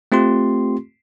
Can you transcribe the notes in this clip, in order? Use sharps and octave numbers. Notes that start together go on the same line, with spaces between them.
A3 C4 F4 G4 C6